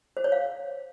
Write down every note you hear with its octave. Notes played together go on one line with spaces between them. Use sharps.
C5
C#5
F5